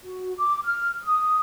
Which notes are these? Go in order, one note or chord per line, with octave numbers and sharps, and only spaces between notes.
F#4
D6
F6
D#6